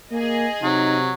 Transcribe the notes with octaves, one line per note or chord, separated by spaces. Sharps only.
A#3 G#4 D#5
C3 F#3 D#4